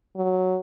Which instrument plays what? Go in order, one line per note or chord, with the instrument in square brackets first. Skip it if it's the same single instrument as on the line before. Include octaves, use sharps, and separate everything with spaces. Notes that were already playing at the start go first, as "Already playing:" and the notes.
[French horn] F#3